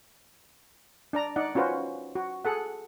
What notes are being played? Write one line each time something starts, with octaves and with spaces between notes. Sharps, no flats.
D4 D5 A#5
D#4 D5 F#5
C#4 F4 F#4 B4 C5
F#4
G#4 A4 F#5